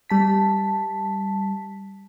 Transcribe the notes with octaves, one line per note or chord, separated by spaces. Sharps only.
G3 A5 B6